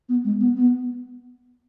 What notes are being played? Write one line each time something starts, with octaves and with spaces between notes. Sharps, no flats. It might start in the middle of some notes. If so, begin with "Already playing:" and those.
B3
G#3
B3
B3